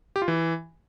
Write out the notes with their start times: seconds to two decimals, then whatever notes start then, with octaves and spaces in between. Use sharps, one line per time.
0.16 G4
0.22 F4
0.28 E3